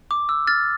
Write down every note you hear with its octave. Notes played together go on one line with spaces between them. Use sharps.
D6
E6
F6 A6